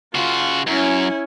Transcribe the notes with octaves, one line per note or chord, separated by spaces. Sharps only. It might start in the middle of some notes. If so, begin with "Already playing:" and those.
C#3 F4 F#4
F#2 C#4 E4